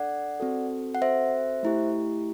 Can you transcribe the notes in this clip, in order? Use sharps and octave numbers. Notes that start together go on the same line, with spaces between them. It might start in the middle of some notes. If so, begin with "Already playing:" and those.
Already playing: D4 A4 D5 F#5
C4 F#4 A4
F#5
C5 E5
A3 E4 G4